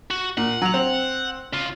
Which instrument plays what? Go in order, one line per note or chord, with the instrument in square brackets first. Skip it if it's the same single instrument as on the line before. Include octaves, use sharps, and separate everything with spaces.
[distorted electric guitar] F#4
[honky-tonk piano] A#2 [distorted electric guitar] F#5
[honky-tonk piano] F#3 F7
C4
[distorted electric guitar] C#3 F4